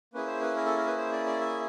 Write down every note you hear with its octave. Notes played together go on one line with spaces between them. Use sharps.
A#3 C#4 E4 G#4 B4
C5
B4
A#4
A4
A#4
B4
C5
D5
D5
E5